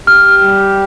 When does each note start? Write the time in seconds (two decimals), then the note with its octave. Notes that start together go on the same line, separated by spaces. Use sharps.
0.07 G4 F6
0.41 G3